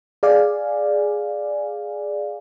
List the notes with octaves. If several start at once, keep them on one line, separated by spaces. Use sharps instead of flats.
G#4 D5 F5 G#5